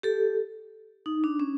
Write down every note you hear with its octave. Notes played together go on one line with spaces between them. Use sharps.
G4 A4
D#4
D4
C#4